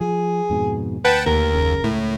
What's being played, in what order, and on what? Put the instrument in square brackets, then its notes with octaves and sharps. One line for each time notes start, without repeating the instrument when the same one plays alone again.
[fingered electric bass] F3 [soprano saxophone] G#4
[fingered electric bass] F2 G#2 B2
[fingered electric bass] D2 [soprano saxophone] B4 [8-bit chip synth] F#5 G5 A5
[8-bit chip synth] D#2 [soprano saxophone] A#4
[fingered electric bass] F#1 C#3
[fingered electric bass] C#2 [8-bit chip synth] A2